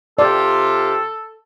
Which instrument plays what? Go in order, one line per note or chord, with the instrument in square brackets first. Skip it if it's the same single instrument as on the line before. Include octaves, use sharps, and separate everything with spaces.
[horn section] C3 F4 G4 [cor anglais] A4 [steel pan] D5